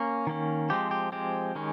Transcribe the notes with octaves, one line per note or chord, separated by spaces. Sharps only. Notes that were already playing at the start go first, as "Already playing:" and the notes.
Already playing: A#3 C#4
D#3 A#3 C#4
F3 G#3 C4 G4
G4
F3 G#3 C4 G4
D#3 G#3 C#4